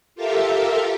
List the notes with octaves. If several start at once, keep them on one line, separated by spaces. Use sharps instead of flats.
F4 G4 A4 A#4 E5 F5